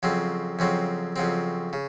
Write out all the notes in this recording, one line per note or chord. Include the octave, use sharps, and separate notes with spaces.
F2 C#3 F#3 C4
F2 C#3 F#3 C4
F2 C#3 F#3 C4
C#3